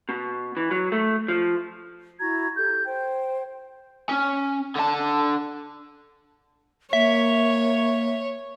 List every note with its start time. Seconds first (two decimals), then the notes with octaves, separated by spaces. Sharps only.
0.09 B2
0.57 E3
0.71 F#3
0.92 A3
1.28 F3
2.20 E4 F#4 A#5 G#6
2.56 G4 A4 G6
2.86 C5 G5
4.09 C#4
4.76 D3 A5
6.93 A#3 C#5 E5